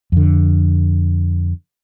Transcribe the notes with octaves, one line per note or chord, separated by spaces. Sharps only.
F2 D3